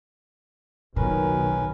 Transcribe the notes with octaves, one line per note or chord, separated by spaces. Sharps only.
F#1 B1 A#2 D#3 C#4 A#4 B4